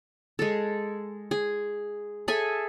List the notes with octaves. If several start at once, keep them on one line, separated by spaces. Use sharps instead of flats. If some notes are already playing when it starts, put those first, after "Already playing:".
G#3 A4
G#4
G#4 A4 E5 G#5